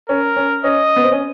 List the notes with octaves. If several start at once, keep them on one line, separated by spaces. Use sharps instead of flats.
C#4 A#4
C#4
C#4 D#5
B3
C4
C#4